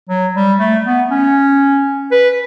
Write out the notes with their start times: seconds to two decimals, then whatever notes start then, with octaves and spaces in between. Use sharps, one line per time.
0.09 F#3
0.35 G3
0.59 A3
0.85 B3
1.11 C#4
2.11 B4